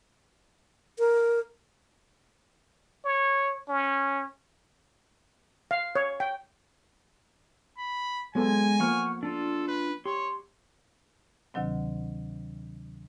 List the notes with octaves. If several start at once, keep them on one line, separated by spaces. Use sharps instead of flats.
A#4
C#5
C#4
F5
C#5
G5
B5
F#3 G#3 B3 A4 G#5
F3 A#3 F#5 C#6 F6
D4 F4 A4
B4
G4 C#5 C6
D2 C3 D#3 F#3 C4